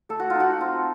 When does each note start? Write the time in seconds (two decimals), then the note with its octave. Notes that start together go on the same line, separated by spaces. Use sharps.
0.09 A3 A4
0.20 F#4
0.30 F4
0.35 D#4 F#4
0.61 C4 F4